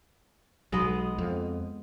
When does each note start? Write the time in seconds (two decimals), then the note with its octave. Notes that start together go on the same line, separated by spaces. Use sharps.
0.72 B1 G#3 B3 D#5
1.18 F2